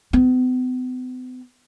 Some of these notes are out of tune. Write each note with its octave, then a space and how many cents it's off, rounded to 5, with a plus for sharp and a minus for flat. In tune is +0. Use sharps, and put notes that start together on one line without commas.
B3 +45